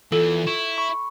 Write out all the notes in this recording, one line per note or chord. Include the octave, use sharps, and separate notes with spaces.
E2 E3 F4 A4
E4 C#6
B5 C#6